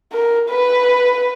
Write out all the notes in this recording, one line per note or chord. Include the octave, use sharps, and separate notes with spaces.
A#4
B4